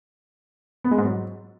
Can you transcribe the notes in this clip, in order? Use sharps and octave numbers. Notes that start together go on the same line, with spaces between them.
B3
G#3
G#2
F#3